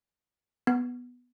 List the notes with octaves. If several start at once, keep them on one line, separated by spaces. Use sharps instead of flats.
B3